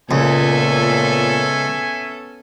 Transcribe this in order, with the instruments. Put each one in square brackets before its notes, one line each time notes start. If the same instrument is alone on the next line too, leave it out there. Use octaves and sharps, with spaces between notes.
[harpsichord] C#2 [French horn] A#2 [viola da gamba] B3 C#4 A4 [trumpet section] E5 G#5